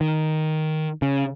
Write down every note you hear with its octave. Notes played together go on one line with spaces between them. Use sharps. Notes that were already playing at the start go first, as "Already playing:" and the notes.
D#3
C#3